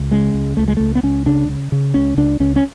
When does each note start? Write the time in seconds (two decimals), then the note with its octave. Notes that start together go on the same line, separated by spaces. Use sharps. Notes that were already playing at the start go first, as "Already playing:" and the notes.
Already playing: C#2
0.11 C#3 G#3
0.34 C#2
0.57 C#2 A3
0.68 G#3
0.77 C#2 A3
0.95 B3
1.03 C#2 C#4
1.26 C#3 D4
1.49 C#3
1.72 C#3
1.94 C#2 C#4
2.18 C#2 D4
2.40 C#2 C#4
2.56 C#4